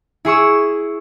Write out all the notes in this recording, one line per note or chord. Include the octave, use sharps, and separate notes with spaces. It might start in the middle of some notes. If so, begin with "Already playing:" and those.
E4 G#4 C#6 E6